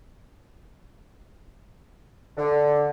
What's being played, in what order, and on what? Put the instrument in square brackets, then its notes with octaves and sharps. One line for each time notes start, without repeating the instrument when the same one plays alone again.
[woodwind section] D3